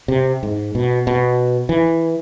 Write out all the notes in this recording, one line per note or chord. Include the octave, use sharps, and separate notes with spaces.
C3
G#2
B2
B2
E3